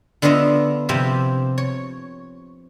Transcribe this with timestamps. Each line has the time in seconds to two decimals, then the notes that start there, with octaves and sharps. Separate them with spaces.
0.22 D3 B3 D4 F4 D#5 E5
0.89 C3 F3 E4 G4
1.58 C#5